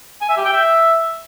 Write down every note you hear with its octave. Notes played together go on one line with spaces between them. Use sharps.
G#5
E5
G4
G5
E5